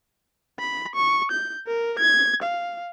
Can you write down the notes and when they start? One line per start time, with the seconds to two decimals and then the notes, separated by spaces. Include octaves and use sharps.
0.59 B5
0.96 C#6
1.32 G6
1.68 A#4
1.99 G#6
2.43 F5